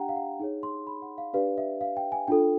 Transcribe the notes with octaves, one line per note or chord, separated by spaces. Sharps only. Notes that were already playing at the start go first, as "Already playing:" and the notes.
Already playing: D4 G4 F#5 G5 A#5
F5
F#5
D#4 G#4 C#5
C6
B5
F#5
F5
D4 G4 B4 D5 F5
E5
F5
G5
G#5
D4 F4 A4 G5